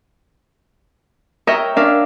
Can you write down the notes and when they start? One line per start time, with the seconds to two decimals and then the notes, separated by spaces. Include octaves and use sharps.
1.47 A#4 C#5 D#5 E5 G5 A#5
1.76 C#4 D4 A#4 D5 E5 F5